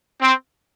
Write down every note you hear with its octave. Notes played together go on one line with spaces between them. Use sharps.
C4